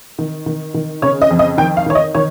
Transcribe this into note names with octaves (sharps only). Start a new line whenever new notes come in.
D#3
D#3
D#3
C#3 C#5
D#5
F2
D#5
D#3 G5
F5
D#3 C#5
D#5
D#3 C#5